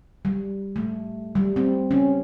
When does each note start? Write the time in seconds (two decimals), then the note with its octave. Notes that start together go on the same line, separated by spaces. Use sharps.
0.25 G3
0.76 A3
1.35 G3
1.56 C4
1.91 C#4